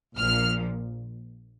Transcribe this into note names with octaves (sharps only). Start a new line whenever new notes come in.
A#1 A#2 F3 F6